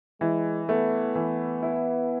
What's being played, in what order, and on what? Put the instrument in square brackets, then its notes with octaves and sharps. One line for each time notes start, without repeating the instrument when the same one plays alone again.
[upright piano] E3 [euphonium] G#3
[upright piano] A3 [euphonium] B3
[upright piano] E3
E4